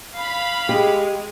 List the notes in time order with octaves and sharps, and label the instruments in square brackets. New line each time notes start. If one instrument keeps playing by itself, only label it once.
[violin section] F5 B5
[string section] G#3 [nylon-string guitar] G4